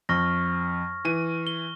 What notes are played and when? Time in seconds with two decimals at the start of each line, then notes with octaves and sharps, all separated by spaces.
0.09 F2 C#6 F6 A#6
1.05 E3 D#7
1.47 G7